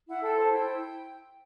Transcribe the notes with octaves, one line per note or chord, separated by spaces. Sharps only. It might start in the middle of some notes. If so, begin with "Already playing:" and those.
E4 F#5
A4 G5
C5 A5
E4 G5
E4